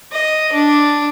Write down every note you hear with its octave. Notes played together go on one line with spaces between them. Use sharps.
D#5
D4